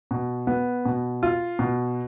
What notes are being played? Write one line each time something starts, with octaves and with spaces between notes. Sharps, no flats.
B2
B3
B2
F4
B2